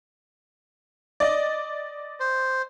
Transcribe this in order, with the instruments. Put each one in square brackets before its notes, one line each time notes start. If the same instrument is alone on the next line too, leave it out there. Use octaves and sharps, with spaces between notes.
[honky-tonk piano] D5 D#5
[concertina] C5